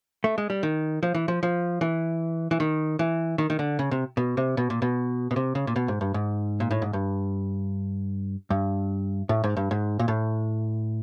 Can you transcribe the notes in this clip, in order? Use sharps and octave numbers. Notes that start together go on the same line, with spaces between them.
A3
G#3
G3
D#3
F3
E3
F3
F3
E3
E3
D#3
E3
D#3
D#3
D3
C#3
C3
B2
C3
B2
A#2
B2
B2
C3
C#3
A#2
B2
G#2
G2
G#2
A#2
A2
G#2
G2
G2
A2
G#2
G2
G#2
A#2
A2